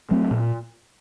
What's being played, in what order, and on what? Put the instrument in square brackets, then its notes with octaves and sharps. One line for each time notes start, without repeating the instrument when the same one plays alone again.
[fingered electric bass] F#3 A3 C4
A#2